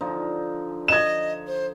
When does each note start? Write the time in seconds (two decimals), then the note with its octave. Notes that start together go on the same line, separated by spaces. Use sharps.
0.01 D3 F3 D#4
0.88 D#5 G#6 E7
1.47 C5